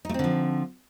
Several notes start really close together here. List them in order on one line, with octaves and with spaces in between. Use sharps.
D#4 A3 C4 D3 F3